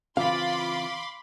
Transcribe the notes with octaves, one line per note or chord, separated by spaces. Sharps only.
C#3 E3 C4 F4 F5 B5 C6 D6